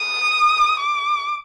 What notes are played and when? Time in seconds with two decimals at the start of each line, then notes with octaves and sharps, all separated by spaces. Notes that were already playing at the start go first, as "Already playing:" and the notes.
Already playing: D#6
0.79 D6